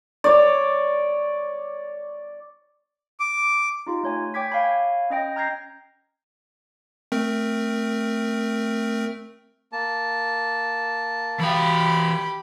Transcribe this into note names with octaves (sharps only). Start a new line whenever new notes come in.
C#5 D5
D6
D#4 F4 G4
A3 C#5 G#5
C#5 G5 D6 G#6 B6
C#5 F5 G#5 B5
C#4 D#5 G5 A#6
A#5 F6 G6 G#6 A#6 C7
A3 C4 A#4
A#3 A5
E3 G4 F5 B5